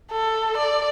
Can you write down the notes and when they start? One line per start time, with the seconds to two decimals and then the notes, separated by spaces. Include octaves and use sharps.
0.12 A4
0.57 D5